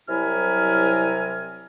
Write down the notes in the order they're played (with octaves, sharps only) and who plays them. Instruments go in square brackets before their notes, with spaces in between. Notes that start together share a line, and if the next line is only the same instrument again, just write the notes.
[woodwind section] C2 C3 F#3 E4 G#5 F6